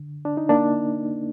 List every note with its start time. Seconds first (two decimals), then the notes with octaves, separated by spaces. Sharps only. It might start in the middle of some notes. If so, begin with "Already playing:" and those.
Already playing: D3
0.25 D4
0.37 D#4
0.49 A#3 D4